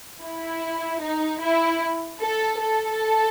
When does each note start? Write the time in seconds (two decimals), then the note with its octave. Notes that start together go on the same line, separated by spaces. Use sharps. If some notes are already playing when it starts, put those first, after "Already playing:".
0.21 E4
1.01 D#4
1.41 E4
2.20 A4
2.60 A4